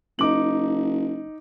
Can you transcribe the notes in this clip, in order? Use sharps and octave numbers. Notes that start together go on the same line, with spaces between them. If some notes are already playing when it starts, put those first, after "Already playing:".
F#1 D#4 D6 F#7